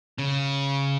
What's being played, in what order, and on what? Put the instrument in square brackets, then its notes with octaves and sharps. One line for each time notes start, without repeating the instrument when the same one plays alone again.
[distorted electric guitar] C#3